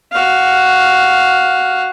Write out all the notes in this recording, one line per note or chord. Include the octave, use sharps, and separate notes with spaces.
F#4 F5